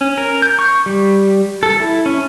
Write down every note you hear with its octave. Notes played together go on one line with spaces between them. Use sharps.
C#4
A#4
G6
C#6
G3
A4
E4
C#4